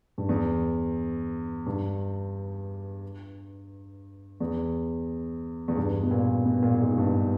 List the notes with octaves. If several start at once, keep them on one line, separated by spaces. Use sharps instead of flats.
G2
E2
G2
E2
E2
G2
B2
A#2
B2
A#2
A#2
G#2
G2